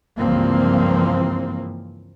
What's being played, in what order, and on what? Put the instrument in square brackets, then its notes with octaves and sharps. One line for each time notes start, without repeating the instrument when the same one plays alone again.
[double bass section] C#2 G2 E3 F3 A#3 C4